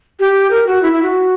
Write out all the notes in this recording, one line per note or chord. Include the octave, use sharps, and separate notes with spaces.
G4
A#4
F#4
E4
E4
F#4